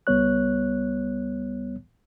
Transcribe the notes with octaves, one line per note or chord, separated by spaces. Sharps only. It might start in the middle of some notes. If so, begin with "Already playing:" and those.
C#2 G3 B3 C#5 F#6